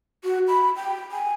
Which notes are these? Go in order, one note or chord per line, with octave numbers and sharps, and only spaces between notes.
F#4
B5
G5
G#5